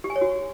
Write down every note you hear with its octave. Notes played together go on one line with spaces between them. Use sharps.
G4
G#5
C#5
F#4